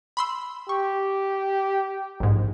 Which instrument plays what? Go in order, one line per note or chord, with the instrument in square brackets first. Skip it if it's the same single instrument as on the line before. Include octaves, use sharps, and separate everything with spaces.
[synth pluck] B5 C6 E6
[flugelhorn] G4 [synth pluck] C#6
[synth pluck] A#1 G#2